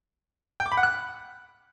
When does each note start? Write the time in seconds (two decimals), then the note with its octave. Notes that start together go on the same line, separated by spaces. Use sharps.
0.60 G5
0.66 D6
0.72 B5
0.77 F#5
0.83 F#6